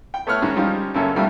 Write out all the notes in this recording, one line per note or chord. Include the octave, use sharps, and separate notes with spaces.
G5
A3 B3 C#5 F6 F#6
G#2 D#3 G#3 C#4
F3 G3 C#4 D#4 F4
F#2 C#3 A#3 C#4 A4 E5
B2 D#3 F3 G3 A3 E4